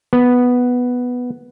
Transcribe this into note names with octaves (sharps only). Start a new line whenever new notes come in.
B3